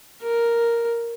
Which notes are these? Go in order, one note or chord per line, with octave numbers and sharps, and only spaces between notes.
A#4